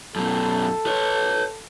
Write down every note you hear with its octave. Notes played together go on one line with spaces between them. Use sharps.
F#2 B2 A4
B4 C#5